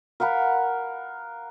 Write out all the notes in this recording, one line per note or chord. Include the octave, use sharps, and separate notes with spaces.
A#4 F5 F#5 B5